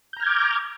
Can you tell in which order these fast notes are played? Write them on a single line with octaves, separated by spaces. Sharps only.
G6 A#5 F6 G#6 D6